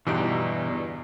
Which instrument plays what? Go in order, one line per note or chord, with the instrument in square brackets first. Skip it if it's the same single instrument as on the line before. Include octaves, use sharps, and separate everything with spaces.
[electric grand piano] E2 G2 D7 [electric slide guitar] B2 E3 [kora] D3 D#4 G4